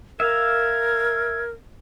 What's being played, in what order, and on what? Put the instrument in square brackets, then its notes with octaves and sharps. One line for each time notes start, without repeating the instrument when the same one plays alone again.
[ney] A#4 [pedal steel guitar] E5 F5 [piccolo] G#6